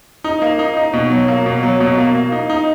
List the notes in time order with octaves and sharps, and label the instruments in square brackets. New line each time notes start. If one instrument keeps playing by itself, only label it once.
[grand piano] D#4
A#3
D#4
D#4
B2
F#3
A#3
B2
F#3
B2
A#3
A#3
D#4
D#4